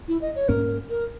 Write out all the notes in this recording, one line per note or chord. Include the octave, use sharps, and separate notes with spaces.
E4
D#5
C#5
G#2 G3 A#3 C#4 A#4
A#4